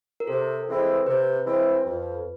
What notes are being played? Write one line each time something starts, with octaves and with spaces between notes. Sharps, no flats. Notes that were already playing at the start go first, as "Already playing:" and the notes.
A#4
C3 A4
E3 G#3 C4 E4
C3 B4
E3 G#3 C4 E4
F2